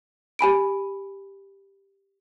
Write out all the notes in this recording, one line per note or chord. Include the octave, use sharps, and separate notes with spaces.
G4 G#5 B5 D7